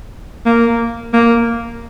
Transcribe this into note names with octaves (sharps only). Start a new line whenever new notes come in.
A#3
A#3